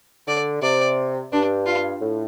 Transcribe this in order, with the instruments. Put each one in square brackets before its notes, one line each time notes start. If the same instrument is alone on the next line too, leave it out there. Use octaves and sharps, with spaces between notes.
[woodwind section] D3 [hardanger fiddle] D5
[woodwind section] C3 [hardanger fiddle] D5
[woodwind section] G2 [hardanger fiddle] D4
[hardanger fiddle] F4
[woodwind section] A2